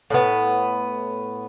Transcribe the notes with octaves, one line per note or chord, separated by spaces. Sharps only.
A2 B3